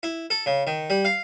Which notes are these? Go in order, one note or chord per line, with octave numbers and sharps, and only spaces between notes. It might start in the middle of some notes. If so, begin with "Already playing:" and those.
E4
A4
C#3
D#3
G3
F5